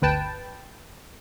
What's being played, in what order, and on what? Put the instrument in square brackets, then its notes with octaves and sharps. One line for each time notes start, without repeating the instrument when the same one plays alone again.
[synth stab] G1 D2 B4 G5 A5